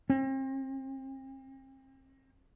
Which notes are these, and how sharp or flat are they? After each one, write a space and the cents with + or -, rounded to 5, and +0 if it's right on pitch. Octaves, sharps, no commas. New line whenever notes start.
C4 +40